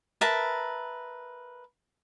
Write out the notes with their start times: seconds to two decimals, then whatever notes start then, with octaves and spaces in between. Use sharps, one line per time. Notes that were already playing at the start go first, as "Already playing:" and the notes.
0.21 A#4 B4 E5 A5